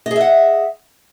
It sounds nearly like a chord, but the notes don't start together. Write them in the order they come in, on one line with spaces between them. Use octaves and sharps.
D#5 G#4 E5 F#5